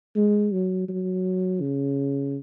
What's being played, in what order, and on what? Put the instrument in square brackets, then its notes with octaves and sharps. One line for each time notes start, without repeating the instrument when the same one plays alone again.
[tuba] G#3
F#3
F#3
C#3